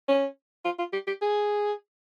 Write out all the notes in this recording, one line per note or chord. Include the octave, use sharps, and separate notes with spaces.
C#4
F4
F4
G4
G4
G#4